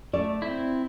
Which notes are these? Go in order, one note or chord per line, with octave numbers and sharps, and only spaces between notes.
A3 D5
C4 E4